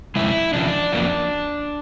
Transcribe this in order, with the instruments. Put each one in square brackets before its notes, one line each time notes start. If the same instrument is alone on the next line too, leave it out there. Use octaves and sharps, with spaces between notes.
[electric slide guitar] F2 C#3 G#3 E4
E2 C#3 F3 D4
F2 C#3 F#3 A#3